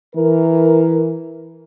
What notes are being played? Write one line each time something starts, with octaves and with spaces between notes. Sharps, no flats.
E3 A#4